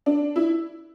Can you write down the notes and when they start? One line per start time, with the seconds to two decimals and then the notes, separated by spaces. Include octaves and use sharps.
0.06 D4
0.36 E4